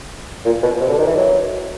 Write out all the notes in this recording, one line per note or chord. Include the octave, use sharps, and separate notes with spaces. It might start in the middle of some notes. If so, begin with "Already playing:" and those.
A#2
B2
C3
D3
D#3
E3
F#3